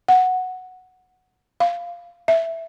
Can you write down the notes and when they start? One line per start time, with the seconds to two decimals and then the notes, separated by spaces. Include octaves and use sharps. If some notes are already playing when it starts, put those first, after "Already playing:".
0.08 F#5
1.60 F5
2.28 E5